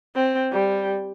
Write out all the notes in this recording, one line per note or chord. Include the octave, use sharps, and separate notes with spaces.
C4
G3